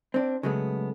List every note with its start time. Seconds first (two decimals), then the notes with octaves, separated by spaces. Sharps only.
0.14 C4 D4
0.43 C#3 F#3 G#3 A3 B3